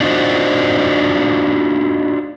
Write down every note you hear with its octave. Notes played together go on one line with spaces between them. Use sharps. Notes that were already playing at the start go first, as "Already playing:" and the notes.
D4 D#4 F4 F#4 C5 D#5